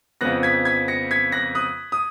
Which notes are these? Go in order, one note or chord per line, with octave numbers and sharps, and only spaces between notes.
F2 C#3 F3 B3 F#6 A#6
G#6 B6
G#6 B6
A#6 C#7
G#6 B6
F#6 A#6
D#6 F#6
D#6